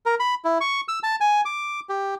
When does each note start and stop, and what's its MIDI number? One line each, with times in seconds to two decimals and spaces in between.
0.06 0.15 70
0.20 0.35 83
0.44 0.58 64
0.61 0.81 85
0.88 0.99 88
1.03 1.16 81
1.20 1.41 80
1.45 1.80 86
1.89 2.15 67